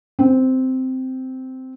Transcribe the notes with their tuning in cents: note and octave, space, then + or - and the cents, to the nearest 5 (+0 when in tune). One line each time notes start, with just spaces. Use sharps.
C4 -10